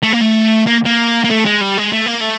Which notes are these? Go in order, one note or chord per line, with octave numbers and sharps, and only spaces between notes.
A3
A#3
A3
A#3
A#3
A#3
A3
G#3
G3
G#3
A3
A#3
A3